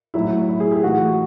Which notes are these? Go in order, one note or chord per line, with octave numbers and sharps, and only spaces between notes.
A2 F#3 E4
E4
G#4
G4
A2 E3 F#4